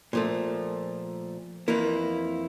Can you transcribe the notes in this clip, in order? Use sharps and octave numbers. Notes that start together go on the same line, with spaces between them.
A#2 F3 A3
F2 E3 A#3 E4